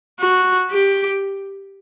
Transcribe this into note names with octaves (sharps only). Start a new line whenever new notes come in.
F#4
G4